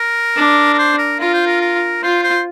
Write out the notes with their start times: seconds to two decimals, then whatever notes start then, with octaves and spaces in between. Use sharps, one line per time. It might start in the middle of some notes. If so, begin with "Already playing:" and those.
Already playing: A#4
0.36 D4
0.74 A#4
0.78 C5
0.98 A#4
1.19 F4 A#4
1.34 C5
1.47 A#4
1.61 A#4
2.02 F4 C5
2.23 C5